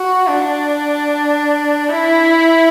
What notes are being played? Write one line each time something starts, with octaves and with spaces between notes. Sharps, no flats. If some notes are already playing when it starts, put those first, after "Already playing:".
Already playing: F#4
D4
E4